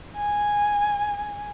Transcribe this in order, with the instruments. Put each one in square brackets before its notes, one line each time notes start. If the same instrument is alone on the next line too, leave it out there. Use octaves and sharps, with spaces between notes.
[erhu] G#5